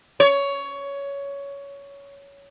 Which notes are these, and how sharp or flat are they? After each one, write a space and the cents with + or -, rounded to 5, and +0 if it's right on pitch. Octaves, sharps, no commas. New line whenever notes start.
C#5 +15